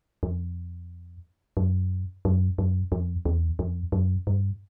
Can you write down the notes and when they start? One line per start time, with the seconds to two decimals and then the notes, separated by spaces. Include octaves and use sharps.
0.23 F2
1.57 F#2
2.25 F#2
2.58 F#2
2.92 F2
3.25 E2
3.59 F2
3.92 F#2
4.27 G2